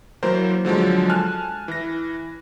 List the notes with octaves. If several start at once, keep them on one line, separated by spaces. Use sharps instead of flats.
E3 F#3 A#3 A#4 C5
D3 F3 F#3 G#3
G#5 A5 F6 F#6
E3 A#6